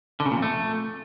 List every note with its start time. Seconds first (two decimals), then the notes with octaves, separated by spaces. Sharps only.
0.20 D3
0.26 C#3
0.31 A#2
0.37 F2
0.42 A3